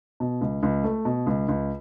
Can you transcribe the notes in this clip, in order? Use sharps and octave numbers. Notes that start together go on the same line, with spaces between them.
B2
C#2
C#2
A3
B2
C#2
C#2